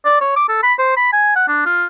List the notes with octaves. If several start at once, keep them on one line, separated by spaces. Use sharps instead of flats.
D5
C#5
D6
A4
B5
C5
B5
G#5
F#5
D4
F4